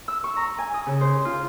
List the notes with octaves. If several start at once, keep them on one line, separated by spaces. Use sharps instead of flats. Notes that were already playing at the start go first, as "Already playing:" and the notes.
E6
C#6
A#5
G#5
D#6
C#3
C5
F4